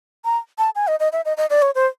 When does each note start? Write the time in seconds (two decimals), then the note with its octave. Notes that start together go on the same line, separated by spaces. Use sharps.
0.25 A#5
0.58 A5
0.75 G#5
0.87 D#5
1.00 D#5
1.13 E5
1.25 D#5
1.37 D#5
1.50 D5
1.62 C#5
1.75 C5